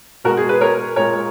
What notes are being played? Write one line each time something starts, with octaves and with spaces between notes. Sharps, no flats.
B2 G#3 F#4 A#4
G#4
G#4 B4
A#4 C#5
A#2 G#3 A#4 C#5